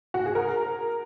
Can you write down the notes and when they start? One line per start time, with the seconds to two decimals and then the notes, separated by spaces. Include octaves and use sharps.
0.14 F#4
0.26 G#4
0.35 A#4